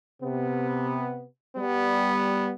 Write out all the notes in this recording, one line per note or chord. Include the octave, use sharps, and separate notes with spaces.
C3 B3
G3 B3